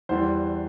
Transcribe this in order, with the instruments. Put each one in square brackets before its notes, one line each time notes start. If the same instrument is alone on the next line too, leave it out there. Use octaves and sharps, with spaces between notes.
[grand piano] E2 E3 G3 C5